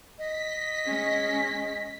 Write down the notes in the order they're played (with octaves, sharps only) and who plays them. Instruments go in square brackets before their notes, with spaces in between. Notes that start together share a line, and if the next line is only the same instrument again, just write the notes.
[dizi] D#5 [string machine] B6
[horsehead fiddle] G#3 C#4